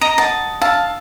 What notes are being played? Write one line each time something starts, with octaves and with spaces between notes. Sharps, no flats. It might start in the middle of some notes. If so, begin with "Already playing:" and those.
D#5 A#5
D#5 F#5 A5 D#6
F5 A5 E6